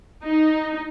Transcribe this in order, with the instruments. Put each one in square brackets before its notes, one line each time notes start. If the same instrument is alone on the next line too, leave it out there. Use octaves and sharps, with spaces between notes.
[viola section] D#4